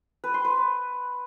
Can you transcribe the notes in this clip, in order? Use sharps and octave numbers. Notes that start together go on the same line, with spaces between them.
B4
C6
B4